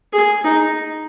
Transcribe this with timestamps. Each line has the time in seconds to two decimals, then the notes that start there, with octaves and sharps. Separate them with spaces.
0.13 G#4
0.44 D#4